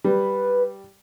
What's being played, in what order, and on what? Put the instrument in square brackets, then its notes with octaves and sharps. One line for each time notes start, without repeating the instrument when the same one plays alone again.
[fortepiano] G3 [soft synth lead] B4